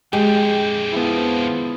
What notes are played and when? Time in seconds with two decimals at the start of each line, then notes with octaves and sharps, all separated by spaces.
0.13 F2 D3 G#3 G4 G5
0.93 F3 B3 E4